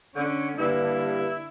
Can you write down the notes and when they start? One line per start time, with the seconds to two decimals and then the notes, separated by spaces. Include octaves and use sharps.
0.16 D3 C#4
0.59 G2 D3 A#3 E4